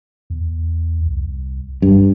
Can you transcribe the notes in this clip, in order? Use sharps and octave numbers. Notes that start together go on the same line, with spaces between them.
E2
C2
F#1 G2